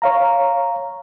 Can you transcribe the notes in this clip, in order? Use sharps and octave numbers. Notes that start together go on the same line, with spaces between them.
C#5 F5 A#5